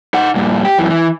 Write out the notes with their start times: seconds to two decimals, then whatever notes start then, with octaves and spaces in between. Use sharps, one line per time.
0.14 D#4 F#5
0.35 G2 A#2
0.65 G4
0.78 F#2 E3
0.90 E3